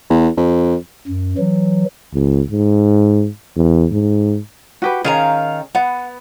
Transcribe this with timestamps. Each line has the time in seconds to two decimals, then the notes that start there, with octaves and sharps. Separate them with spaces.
0.10 E2
0.37 F2
1.08 F#2
1.38 E3 F#3
2.14 C#2
2.51 G#2
3.56 E2
3.91 G#2
4.82 F#4 G4 B4
5.05 D#3 C#4 G#4 F5 A#5
5.75 B3 F#5